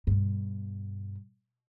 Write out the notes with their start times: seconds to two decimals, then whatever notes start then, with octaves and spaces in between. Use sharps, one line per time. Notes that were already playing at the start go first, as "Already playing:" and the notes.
0.07 G2 B2